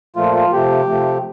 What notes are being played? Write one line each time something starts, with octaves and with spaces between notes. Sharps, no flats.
A#2 F3 A3 F4
F4
C3 F3 A3 G4
C3 F3 A3